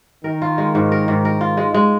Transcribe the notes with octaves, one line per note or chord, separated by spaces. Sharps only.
D#3 A#4
F4
G#3
G#2
A#4
G#2
A#4
F4
G#3
G#3